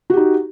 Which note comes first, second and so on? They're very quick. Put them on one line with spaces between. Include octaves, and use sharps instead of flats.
F#4 G4 D#4